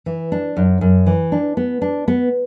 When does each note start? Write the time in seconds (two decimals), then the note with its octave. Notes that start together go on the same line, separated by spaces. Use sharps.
0.06 E3
0.32 D4
0.57 F#2
0.81 F#2
1.07 E3
1.32 D4
1.57 B3
1.82 D4
2.08 B3